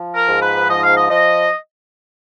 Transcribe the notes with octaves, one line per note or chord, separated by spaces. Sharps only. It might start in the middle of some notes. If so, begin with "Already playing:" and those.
Already playing: F3
A#4
G#2
B4
F3 D#5
F5
D#5
F3 D#5